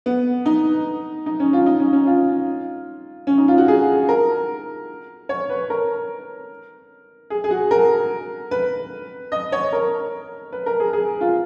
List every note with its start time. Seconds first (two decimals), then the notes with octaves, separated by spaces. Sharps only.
0.06 B3
0.46 D#4
1.26 D#4
1.40 C#4
1.53 F4
1.66 D#4
1.79 C#4
1.93 C#4
2.06 F4
3.27 C#4
3.38 D#4
3.48 F4
3.58 F#4
3.68 G#4
4.09 A#4
5.29 C#5
5.49 B4
5.70 A#4
7.30 G#4
7.44 G#4
7.51 F#4
7.71 A#4
8.51 B4
9.32 D#5
9.52 C#5
9.72 A#4
10.52 B4
10.66 A#4
10.80 G#4
10.93 G#4
11.21 F4